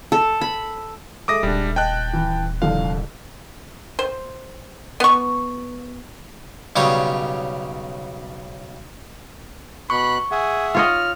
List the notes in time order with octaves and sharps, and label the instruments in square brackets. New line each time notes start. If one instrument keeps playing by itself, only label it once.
[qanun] A4
B5
[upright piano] G#3 A4 E5 [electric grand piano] D6 D#6 A#6
[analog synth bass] D#1 [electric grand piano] G3 D4
[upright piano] D#5 [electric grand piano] G5 A5 F#6
[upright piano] E3
[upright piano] C2 F2 D3 [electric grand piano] F5
[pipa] C5
B3 C#6
[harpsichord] B1 C#3 G3 C#5 D#6
[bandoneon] B2 F#6 [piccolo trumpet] B5 [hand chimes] C#6
[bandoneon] G#4 E5 F#5 [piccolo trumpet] G#5
[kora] F4 C#5 D#5 [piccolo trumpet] F6